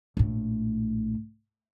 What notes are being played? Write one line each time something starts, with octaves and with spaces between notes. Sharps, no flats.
A#1 A2